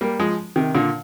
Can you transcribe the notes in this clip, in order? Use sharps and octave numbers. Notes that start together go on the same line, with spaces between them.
G3 A#3
F3 G#3
C3 D#3
A#2 D3